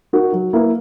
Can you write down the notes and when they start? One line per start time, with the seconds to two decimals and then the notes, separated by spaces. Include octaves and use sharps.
0.13 D#4 F#4 A#4
0.33 F#3
0.53 A#3 E4 B4